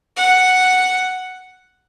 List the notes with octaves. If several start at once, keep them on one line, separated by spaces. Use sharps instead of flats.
F#5